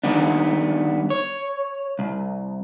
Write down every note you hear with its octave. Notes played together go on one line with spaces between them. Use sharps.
D#3 G3 B3 D4
C#5
C2